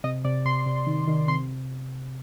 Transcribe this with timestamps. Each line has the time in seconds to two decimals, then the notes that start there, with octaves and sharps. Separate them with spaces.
0.04 C3 D#5
0.25 C3 D5
0.45 C3 C6
0.66 C3
0.87 D#3
1.07 D#3
1.28 C3 C6